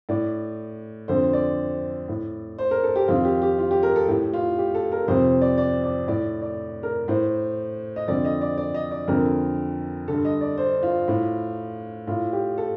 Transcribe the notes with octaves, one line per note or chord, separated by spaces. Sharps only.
A2 D5
F2 D3 C5
D5
A2
C5
A#4
A4
G4
F2 D#3 F4
G4
G4
F4
G4
A#4
A4
A2 G4
F4
G4
A4
A#4
F2 C3 D#3 C5
D5
D5
D5
A2 D5
D5
A#4
A2 C5
D#5
F2 D3 D5
D#5
D5
D5
D#5
D5
F2 D3 A#4
G2 D3 A4
D#5
D5
C5
F4
A2
A2 F4
G4
A4